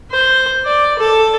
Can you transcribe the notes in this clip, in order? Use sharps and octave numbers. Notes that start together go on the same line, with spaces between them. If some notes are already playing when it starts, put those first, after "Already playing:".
C5
D5
A4